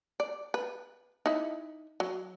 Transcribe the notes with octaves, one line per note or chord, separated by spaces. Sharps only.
D5
B4
D#4 E4
F#3